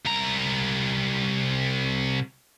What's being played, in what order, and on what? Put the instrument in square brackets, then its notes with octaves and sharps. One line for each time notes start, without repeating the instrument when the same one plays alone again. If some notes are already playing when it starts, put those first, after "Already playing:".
[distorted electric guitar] C2 A#5